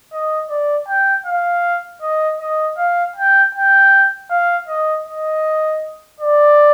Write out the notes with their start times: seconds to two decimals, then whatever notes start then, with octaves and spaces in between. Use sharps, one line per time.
0.13 D#5
0.50 D5
0.88 G5
1.26 F5
2.02 D#5
2.40 D#5
2.78 F5
3.16 G5
3.55 G5
4.30 F5
4.68 D#5
5.07 D#5
6.20 D5